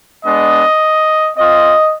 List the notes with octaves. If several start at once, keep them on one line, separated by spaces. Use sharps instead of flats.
G#3 B3 D4 D#5
C4 F4 D#5